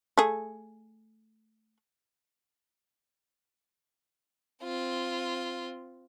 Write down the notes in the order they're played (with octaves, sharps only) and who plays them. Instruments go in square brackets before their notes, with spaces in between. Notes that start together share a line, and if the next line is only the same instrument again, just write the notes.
[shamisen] A3 G#4
[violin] C4 F4